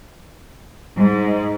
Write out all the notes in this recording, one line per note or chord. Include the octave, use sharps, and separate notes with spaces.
G#2